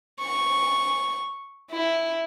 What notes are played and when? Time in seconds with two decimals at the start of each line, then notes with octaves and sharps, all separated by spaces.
0.20 C#6
1.71 E4